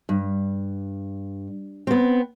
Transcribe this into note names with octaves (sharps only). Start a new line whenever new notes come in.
G2
B3 C4